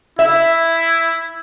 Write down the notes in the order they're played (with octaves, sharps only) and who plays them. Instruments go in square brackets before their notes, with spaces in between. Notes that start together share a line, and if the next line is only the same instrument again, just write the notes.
[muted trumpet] E4 [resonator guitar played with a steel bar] E5